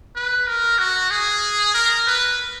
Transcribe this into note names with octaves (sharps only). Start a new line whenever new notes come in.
B4
A#4
F#4
G#4
A#4
B4